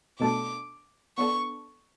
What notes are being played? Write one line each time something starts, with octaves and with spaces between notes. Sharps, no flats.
B2 A3 D4 A4 D6
B3 D4 A4 C#6